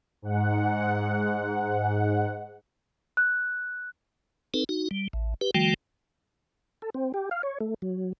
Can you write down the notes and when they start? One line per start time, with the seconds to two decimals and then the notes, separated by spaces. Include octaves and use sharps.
0.22 G#2 F#5
3.17 F#6
4.54 C4 D#4 A4 B4
4.69 D#4 F#4
4.91 G3
5.13 A1
5.41 G4 B4
5.55 D#3 F3 G3 A3 F#4 G5
6.82 A4
6.94 C4
7.14 G4
7.31 F5
7.43 C#5
7.60 A3
7.82 F#3